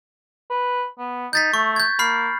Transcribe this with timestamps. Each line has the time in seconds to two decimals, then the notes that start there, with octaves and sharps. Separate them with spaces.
0.50 B4
0.98 B3
1.33 D#4 G6 A6 B6
1.54 A3 C#6
1.76 G6 G#6
1.99 A#3 B5 F6 C7